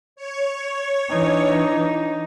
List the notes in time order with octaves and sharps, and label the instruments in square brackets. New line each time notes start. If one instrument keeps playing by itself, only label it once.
[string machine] C#5
[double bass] E3 D4 [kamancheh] D#4